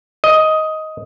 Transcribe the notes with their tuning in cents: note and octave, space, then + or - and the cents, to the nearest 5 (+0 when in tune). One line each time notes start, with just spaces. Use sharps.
D#5 +10